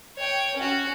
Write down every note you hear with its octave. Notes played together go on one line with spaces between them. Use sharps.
C#5 G5
C#4 F#4